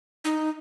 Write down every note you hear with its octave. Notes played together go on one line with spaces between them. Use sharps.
D#4